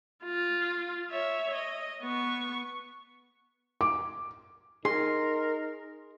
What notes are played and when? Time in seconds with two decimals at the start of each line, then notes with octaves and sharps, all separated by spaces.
0.24 F4
1.11 C#5 E5
1.54 D#5
2.01 B3 C#6
3.81 D6
4.85 D#4 G#4 A#4 C6